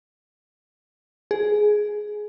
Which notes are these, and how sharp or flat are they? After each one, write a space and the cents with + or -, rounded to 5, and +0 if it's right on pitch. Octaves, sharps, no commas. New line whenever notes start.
G#4 +10